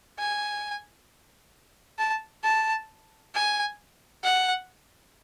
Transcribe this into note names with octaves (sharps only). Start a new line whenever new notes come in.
G#5
A5
A5
G#5
F#5